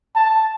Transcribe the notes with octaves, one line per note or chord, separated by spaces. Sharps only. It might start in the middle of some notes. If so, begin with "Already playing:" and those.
A5